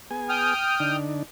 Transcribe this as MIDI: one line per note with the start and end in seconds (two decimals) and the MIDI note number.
0.11 0.54 59
0.11 0.54 68
0.11 0.54 80
0.29 0.96 79
0.29 0.96 87
0.29 0.96 89
0.80 1.23 50
0.80 1.23 62
0.80 1.23 63